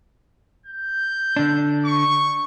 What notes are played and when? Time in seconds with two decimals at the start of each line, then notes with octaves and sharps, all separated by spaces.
0.66 G6
1.36 D3 D4
1.85 C#6